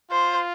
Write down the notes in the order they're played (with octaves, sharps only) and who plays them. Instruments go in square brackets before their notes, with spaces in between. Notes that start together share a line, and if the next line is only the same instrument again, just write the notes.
[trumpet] F4 [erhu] C5